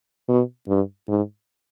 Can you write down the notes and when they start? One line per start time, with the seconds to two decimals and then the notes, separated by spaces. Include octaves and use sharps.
0.28 B2
0.68 G2
1.08 G#2